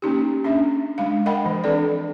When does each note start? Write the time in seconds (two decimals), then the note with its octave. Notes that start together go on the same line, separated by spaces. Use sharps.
0.02 A#3 C#4 D#4 G4
0.44 C#4 D4 E5
0.98 G#3 D4 F5
1.26 A#4 D#5 F#5 G5 B5
1.45 E3 F3
1.64 C4 D4 A4 B4 D5